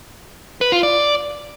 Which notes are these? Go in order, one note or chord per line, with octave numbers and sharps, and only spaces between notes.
B4
F4
D5